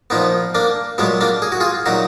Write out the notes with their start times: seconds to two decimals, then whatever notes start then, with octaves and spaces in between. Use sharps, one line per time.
0.10 A#2 F3 B3 D#4
0.55 A#3 D4
0.98 A#2 F#3 G#3 B3
1.21 A#3 D4
1.42 G#4
1.52 F#4
1.60 F4 G#4
1.86 A#2 F#3 D#4 F#4